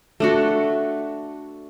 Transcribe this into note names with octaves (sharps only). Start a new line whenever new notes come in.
A3 D4 F#4